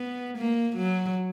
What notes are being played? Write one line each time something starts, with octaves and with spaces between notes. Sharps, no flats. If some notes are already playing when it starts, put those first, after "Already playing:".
Already playing: B3
A#3
F#3